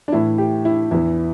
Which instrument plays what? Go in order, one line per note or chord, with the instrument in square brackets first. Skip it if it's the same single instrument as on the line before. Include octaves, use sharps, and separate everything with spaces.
[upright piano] D4
A2 E3 E4
G4
E4
E2 E3 E4